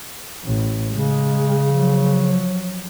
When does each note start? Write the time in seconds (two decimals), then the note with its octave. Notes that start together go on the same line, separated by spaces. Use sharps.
0.45 A1
0.92 C#3 G#3
1.73 F3 F#3